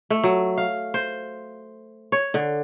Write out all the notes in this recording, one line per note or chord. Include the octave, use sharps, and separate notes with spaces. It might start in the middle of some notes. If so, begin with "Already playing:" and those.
A3
F#3
F5
C5
C#5
D3